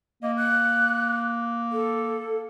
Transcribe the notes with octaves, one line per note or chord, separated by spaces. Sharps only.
A#3 D#5
F#6
A4